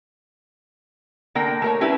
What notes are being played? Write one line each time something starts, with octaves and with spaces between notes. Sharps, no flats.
D3 A#3 A#4 G5
A3 A#4 C#5
C#4 D4 E4 G4 B4